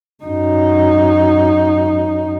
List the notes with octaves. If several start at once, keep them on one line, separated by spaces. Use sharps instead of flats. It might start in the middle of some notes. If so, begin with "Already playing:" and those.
F#2 D#4